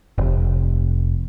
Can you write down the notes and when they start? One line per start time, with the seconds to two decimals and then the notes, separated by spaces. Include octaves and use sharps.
0.18 F1